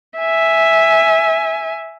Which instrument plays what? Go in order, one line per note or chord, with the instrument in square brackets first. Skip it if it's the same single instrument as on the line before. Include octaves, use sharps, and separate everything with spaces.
[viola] E5 G#5